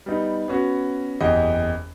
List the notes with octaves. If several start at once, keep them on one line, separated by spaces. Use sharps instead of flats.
G3 B3 D#4
B3 C#4 F#4
F#1 E2 G4 D#5